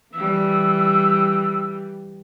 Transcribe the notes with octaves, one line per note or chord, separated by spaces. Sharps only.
E3 G3 E6